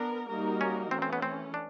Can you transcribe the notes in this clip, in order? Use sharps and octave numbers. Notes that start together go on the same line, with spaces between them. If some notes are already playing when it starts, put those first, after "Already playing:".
Already playing: B3 D4 A#4
G3 A#3 D#4 F#4 A#4
C#4
E3 A3 C4 C#4
C4
B3
C4
D4